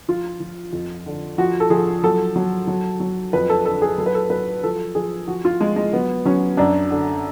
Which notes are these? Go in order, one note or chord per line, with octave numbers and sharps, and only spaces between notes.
F3 F4
F3
F2
D3
F3 F#4
A4
F3 G#4
F#3 A4
F#3
F#3
F#3
F2 B4
A4
D3 A4
G#4
F#3 A4
B4
A4
F#3 B4
F3 A4
F3 G#4
F3 F#4
F4
F3 G#3
G#3
F#3 B3
F#3 C#4
F#2 D4
D3